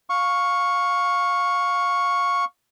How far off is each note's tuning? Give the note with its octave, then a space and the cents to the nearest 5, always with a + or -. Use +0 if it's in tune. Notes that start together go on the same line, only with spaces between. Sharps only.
F5 +20 C#6 +0